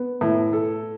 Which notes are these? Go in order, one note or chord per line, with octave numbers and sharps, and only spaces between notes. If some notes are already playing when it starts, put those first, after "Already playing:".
Already playing: B3
A2 E4
A4